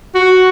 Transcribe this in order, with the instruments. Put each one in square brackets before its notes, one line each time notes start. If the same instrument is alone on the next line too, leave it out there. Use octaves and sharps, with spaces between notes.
[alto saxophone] F#4